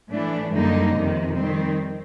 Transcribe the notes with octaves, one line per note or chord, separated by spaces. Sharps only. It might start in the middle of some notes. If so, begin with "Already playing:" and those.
A2 E3 A3 D4
F#2 D3 G3 A#3 D#4
F2 C3 D#3
D#3 G3 C4